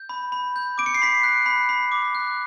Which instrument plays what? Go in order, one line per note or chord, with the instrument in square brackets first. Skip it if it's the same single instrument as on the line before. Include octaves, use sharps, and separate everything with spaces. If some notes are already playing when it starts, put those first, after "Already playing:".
Already playing: [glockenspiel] G6
B5
B5
G6
D6 D7
C#7
C7
B5 B6 C#7
F#6
B5
B5
D6
F#6